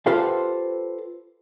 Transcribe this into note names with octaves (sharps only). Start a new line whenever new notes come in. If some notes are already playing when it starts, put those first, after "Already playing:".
F4 G4 A4 B4 C5 F5